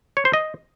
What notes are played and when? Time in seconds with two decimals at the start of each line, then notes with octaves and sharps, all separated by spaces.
0.17 C#5
0.25 C5
0.33 D#5